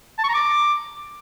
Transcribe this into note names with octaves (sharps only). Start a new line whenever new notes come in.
A5
C#6
A#5
D6